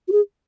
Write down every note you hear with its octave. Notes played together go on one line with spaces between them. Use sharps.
F#4
G#4